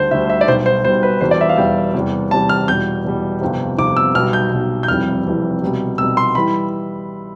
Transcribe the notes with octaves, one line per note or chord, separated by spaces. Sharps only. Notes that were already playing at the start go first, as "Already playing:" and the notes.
Already playing: D2 D3 G3 C5
D2 D3 G3 E5
E5
D5
B1 B2 G3 C5
C5
B1 B2 G3 C5
B4
E1 E2 B2 G3 C5
D5
E5
F5
E1 E2 B2 G3 G5
E2 C3 G3
E2 C3 G3 A5
F6
E2 B2 G3 G6
E2 B2 G3
G1 F2 C3
G1 F2 C3 D6
E6
B1 B2 G3 F6
G6
B1 B2 G3
G6
F1 F2 E3 G3 F6
F1 F2 E3 G3
C2 B2 G3
C2 B2 G3 E6
C6
E3 G3 B5